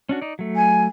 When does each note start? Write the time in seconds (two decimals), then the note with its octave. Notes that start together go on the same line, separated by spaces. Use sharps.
0.09 C#4 D4 F#4
0.21 D#4 D5
0.39 F#3 A3
0.56 G#5